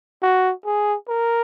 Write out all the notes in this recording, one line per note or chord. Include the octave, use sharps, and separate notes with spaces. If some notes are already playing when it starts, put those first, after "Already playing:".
F#4
G#4
A#4